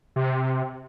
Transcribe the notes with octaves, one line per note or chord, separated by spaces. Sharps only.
C3